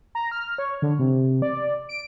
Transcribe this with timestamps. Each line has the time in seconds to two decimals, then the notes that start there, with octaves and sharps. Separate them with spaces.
0.15 A#5
0.31 F6
0.58 C#5
0.82 D3
0.99 C3
1.42 D5
1.89 D7